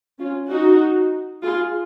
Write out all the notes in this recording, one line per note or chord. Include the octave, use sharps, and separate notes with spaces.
C#4 F4
D#4 F#4
F4 G#4